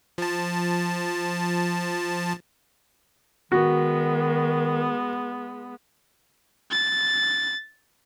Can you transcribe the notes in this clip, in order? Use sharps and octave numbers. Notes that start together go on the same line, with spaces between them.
F3 A5
D#3 G#3 B3 F#4
A6